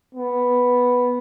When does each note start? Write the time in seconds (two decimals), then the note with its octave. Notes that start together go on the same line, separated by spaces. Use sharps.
0.15 B3